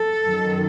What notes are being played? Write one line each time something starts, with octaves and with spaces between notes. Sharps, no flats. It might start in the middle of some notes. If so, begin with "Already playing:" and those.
Already playing: A4
F#2 D#3 F#3